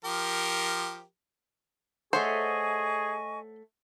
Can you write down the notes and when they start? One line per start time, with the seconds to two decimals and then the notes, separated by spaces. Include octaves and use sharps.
0.05 F3 G4 A#4
2.13 A3 G#4 C5 C#5 D#5 F#5 G#5 C#6